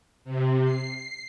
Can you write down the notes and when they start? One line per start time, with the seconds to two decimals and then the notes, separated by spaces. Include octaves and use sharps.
0.25 C3
0.64 C7